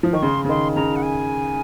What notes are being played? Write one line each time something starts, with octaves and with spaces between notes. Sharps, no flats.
F3
D#3 C#6
C#3 C6
C#3
D#3 C6
C#3 A#5
F#5
G#5